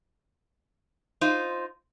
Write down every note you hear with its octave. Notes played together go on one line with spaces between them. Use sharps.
D#4 F4 C5